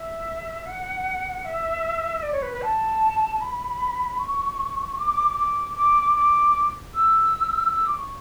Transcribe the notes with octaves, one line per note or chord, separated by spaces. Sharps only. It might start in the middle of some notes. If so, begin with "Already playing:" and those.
Already playing: E5
F#5
E5
D5
C#5
B4
B4
A5
B5
C#6
D6
D6
D6
D6
E6
E6
D6
C#6